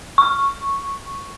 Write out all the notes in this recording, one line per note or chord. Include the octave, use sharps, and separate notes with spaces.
C#6